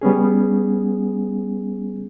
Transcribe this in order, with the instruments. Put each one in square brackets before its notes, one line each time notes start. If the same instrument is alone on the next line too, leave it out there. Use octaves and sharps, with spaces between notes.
[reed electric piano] G3 B3 C#4 G#4